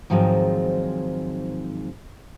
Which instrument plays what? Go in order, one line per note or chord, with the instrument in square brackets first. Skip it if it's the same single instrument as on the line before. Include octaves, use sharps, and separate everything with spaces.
[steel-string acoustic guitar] G#2 D#3 F3 F#3 G#3 C4